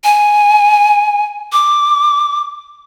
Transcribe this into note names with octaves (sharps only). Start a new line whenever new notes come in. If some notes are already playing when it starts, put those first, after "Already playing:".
G#5
D6